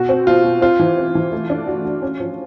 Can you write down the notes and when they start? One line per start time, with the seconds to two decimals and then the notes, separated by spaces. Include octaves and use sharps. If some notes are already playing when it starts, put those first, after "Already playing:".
Already playing: B2 F#4
0.09 C4
0.27 B2 F4
0.44 B2
0.62 C4 F4
0.80 E3
0.97 C4
1.15 E3
1.32 A3
1.50 D4
1.67 F#4
1.85 F#4
2.02 C#4
2.20 F3